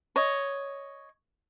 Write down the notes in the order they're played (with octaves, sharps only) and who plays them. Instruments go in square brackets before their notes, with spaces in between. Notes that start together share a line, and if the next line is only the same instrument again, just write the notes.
[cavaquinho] C#5 D#5